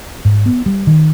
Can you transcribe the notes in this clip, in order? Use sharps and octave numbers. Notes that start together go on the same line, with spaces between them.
G#2
B3
G3
D#3